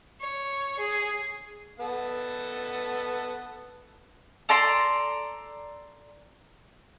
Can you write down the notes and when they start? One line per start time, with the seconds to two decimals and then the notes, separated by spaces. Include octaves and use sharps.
0.20 C#5
0.79 G#4
1.80 B3 A4 F#5
4.49 A4 D5 A#5 C6